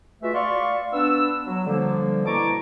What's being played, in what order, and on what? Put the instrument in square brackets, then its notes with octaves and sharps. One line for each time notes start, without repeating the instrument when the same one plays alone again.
[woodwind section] G#3 A3 F4 F#4 B4 E5
D5 F5 C6 C#6
B3 D4 E6
F#3
D3 F3 G3 A#3
B2 E4 A5 A#5 C#6 D6